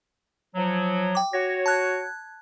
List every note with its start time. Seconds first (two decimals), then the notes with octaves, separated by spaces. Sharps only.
0.55 F3 F#3
1.15 G5 D6
1.33 F#4 C#5 A#6
1.66 A5 F#6 G#6